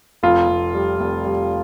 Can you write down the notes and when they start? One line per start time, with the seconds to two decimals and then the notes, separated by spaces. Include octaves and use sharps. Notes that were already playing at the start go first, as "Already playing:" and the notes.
0.23 F1 F4
0.48 F1
0.74 G3
1.00 F1
1.24 G3